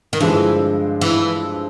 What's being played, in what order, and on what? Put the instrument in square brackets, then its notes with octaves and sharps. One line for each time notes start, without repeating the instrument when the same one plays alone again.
[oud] D#3
[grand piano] G2 D3 F3 G#3 C4 [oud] E3
[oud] E3